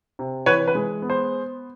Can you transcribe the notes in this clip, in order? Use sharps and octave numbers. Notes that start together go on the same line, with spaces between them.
C3
E3 B4 C#5
B4
G#3
B3
C5